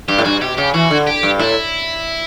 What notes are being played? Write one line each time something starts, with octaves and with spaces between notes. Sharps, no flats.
G2 G4
A2
G2 F#4
B2 G4
C#3 G4
E3 F#4
D3
G4
G2
A2 E4